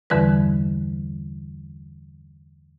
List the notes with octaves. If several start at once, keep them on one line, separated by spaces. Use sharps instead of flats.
E2 G2 D3 E3 G3 B4